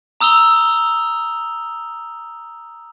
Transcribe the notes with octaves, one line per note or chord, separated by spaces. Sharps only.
A#5 D#6 E6 F7 G7